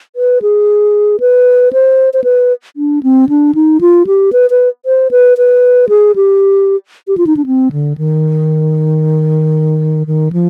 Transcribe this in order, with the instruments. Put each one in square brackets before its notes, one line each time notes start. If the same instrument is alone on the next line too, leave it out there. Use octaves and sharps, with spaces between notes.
[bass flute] B4
G#4
B4
C5
C5
B4
D4
C4
D4
D#4
F4
G4
B4
B4
C5
B4
B4
G#4
G4
G4
F4
D#4
D4
C4
D3
D#3
D#3
F3